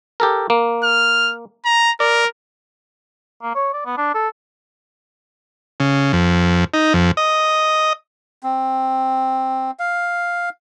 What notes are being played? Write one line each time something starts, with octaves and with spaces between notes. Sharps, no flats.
G4 A4 A#4
A#3
F6
A#5
A#4 D5
A#3
C#5
D5
B3
D4
A4
C#3
F2
D#4
F2
D#5
C4
F5